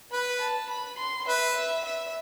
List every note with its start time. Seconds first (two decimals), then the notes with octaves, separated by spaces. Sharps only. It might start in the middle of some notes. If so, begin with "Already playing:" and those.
0.12 B4 B5
0.41 A5
0.70 B5
0.99 C6
1.27 B4 E5
1.56 E5
1.85 E5